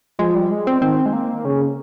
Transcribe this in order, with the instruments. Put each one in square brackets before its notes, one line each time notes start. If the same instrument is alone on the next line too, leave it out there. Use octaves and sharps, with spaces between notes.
[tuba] F3 [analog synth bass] G#3
[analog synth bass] G3
G#3
C4
[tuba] D#3 [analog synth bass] C4
[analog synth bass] G#3
A#3
[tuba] C#3 [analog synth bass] C#4